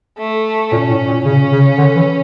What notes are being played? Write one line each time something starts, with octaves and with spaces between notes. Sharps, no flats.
A3
A#2 C#4
A2
A#2
C#3 C#4
C#3
D3
E3